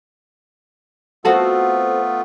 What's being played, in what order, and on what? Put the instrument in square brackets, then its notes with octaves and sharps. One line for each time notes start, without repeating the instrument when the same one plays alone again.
[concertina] A3 B3 F4 [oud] C4 F#4 A4